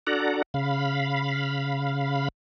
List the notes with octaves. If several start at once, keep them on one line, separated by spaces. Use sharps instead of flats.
D4 F#4 A4 D5 F#5 A#5
C#3 F5 B5